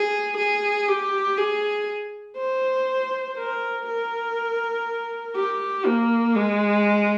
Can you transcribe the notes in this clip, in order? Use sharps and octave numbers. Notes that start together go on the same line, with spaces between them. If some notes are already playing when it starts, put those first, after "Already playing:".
Already playing: G#4
G#4
G4
G#4
C5
A#4
A#4
G4
A#3
G#3